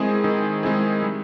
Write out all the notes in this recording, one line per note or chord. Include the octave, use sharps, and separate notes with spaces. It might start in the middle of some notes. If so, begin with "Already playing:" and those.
Already playing: D#3 G#3 C4 E4 G#4
D#3
G#3 C4 E4 G#4
G3